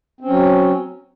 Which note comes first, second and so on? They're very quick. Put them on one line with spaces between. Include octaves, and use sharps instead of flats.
C4 C#4 F#3